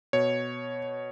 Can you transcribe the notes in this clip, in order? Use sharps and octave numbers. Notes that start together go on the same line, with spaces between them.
B2 C#5